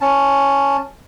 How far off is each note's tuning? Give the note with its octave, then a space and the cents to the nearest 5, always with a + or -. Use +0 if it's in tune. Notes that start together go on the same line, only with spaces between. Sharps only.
C#4 +0 A5 +0